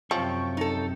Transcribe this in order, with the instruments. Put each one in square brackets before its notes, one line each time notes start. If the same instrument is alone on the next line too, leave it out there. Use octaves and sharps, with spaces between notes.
[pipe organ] F#2 C3 [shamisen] F3 [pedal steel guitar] C#5 G5 C#6
[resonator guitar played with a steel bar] D#4 A4